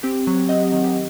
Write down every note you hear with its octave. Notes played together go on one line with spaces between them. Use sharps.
C4 G4
F#3
C4 D#5 F#5
D#3
G4